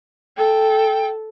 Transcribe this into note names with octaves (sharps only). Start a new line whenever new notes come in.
A4 G5